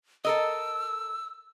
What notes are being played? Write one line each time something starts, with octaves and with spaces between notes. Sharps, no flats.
A4 A#4 D#5 E6